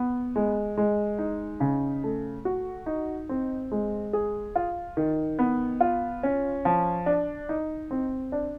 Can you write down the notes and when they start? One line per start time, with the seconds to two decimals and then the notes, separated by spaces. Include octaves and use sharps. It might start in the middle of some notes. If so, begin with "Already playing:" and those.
Already playing: B3
0.36 G#3
0.78 G#3
1.19 D#4
1.60 C#3
2.04 A3
2.45 F#4
2.86 D#4
3.29 C4
3.72 G#3
4.13 G#4
4.56 F4
4.97 D#3
5.39 B3
5.81 F4
6.23 C#4
6.65 F3
7.06 D4
7.49 D#4
7.91 C4
8.32 D4